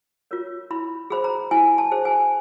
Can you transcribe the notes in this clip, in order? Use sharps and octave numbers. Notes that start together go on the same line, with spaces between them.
F4 A#4 C#5
E4 B5
G#4 C5 B5
A#5
E4 G#5
A5
G#4 C5
G#5